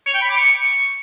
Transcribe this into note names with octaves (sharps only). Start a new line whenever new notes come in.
C#5
G5
B5
D6
C#6